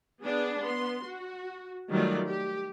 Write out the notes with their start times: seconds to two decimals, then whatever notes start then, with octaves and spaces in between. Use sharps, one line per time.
0.22 B3 D4 G#4
0.62 B3 C6
1.05 F#4
1.90 D#3 F#3 G3 A3 F4 D5
2.26 G4